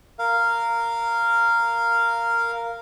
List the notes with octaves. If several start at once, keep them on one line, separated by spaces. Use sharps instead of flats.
A#4 F5